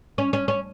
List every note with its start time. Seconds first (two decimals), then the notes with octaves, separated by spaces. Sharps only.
0.18 C#4
0.33 C#4
0.48 C#4